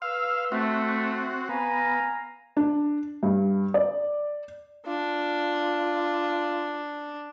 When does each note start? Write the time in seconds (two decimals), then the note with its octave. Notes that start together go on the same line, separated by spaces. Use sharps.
0.02 B4 F5 C6 E6
0.52 A3 C4 F#4
1.49 B3 F5 G#5 A#5
2.57 D4
3.23 G2
3.74 D5
4.87 D4 F4